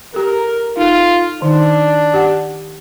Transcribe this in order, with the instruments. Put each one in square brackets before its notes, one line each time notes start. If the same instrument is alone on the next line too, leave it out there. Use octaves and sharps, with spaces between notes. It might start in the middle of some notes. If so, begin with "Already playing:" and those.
[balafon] G4 A4 [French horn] A#4
[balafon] D#4 A4 [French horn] F4
[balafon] D#3 D#4 [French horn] D4
[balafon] G4 F#5